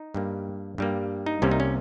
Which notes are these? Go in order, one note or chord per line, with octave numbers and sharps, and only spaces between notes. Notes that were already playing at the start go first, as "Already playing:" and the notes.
Already playing: D#4
G2 G3 A#3
G2 G3 A#3
D#4
C2 C3 G3 A#3 C#4
D#4
C#4